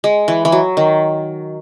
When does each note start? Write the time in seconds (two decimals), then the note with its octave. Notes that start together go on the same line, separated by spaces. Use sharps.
0.04 G#3
0.28 E3
0.45 E3
0.52 F#3
0.77 D#3